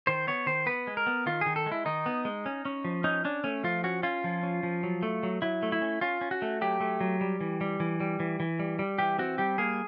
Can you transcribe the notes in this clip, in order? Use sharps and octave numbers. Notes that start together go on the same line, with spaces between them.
D#3 C5
B3 C#5
D#3 C5
B3 B4
G#3
A#4
B3
D#3 F4
D#3 G#4
A4
G#3
E4
D#3 D#4
B3
G#3
C#4
C#4
F3
C#4 D#4
C#4 D4
A3 C#4
F3 F4
C#4 F#4
C#4 F4
F3
C#4
F3
F#3
A3
F#3
F#3 E4
A3
E4
C#4
C#4 F4
C#4
F#4
A3
F#3 G4
A3
F#3
G3
E3
G3
E3
G3
E3
E3
G3
G3
E3 G4
C4 F#4
G3 G4
A#3 G#4